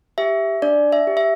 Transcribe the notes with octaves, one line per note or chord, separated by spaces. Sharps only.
G4 E5
D4 D5
E5
G4
E5